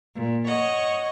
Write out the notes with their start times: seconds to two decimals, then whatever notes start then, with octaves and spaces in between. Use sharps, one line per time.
0.15 A#2
0.47 C#5 D#5 F#5 C#6